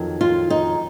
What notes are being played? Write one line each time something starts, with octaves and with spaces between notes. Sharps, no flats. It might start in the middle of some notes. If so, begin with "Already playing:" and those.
Already playing: F2 D#3 F#3
F4
D#4